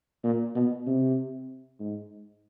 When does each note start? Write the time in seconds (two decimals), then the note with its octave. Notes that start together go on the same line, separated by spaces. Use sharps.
0.23 A#2
0.55 B2
0.86 C3
1.80 G#2